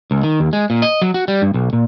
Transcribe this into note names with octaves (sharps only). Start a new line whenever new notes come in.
C#2
D#3
D#2
G#3
A#2
D#5
F#3
F#4
G3
G2
B1
A#2